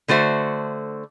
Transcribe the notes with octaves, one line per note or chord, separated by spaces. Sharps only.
D3 A3 F#4 C5 E5